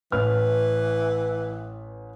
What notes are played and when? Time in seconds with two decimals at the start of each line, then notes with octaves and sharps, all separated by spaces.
0.12 A1 E3 B4 F6